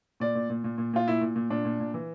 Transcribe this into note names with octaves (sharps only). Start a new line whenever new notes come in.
A#2 D5
A#2
A#2
A#2
A#2
A#2 F4
A#2 E4
A#2
A#2
A#2 D4
A#2
A#2
E3